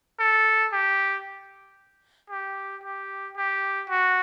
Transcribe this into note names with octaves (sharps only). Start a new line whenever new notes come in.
A4
G4
G4
G4
G4
F#4